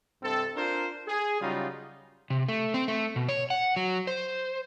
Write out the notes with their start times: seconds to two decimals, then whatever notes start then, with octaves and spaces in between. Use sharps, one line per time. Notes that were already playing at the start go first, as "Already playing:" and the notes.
0.22 G2 C3 C4 A4
0.57 D4 F4 A#4 C5
1.08 G#4
1.41 C#3 F#3 G3 D#4 F4
2.30 C3
2.49 A3
2.74 C4
2.88 A3
3.16 B2
3.29 C#5
3.50 F#5
3.77 F#3
4.07 C5